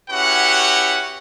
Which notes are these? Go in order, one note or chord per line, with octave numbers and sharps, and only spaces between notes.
C#4 E4 F#4 G4 B4 F#5